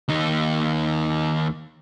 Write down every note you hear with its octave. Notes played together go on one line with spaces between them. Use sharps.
D#2 D#4